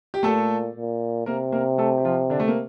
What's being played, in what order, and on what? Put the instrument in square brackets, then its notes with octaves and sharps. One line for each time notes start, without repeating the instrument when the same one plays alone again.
[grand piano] G4
[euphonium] A#2 [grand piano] A3 A4
[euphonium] A#2
[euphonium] C3 [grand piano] A#3 A#4
[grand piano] A#3 A#4
A3 A4
G4
F3 F4
D3 D4
A3
A#3